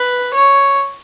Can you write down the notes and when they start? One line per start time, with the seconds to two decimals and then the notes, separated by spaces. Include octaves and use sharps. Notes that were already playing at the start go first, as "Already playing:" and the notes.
Already playing: B4
0.34 C#5